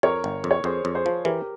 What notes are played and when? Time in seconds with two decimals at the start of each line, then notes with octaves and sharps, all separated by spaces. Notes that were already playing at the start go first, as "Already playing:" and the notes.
0.03 F2 A#4 C#5
0.24 G1
0.44 F2
0.51 C#5
0.64 F2 G#4 C5
0.85 F2
0.95 G#4 C5
1.06 F3
1.25 E3 G4 A#4